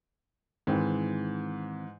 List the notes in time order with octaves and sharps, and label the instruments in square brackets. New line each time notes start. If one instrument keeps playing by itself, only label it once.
[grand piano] G#2 E3 [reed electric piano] D#3 C4